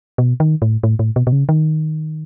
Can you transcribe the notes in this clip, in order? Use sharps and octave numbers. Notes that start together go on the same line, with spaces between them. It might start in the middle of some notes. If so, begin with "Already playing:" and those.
B2
D#3
A2
A2
A2
B2
B2
C#3
D#3